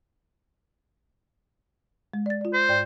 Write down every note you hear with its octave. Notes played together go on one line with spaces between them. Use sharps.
G#3
D5 A6
F4 D5
C5
G#2 D5 G5